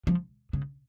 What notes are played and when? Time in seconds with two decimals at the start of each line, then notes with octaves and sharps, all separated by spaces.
0.07 F3
0.53 C#3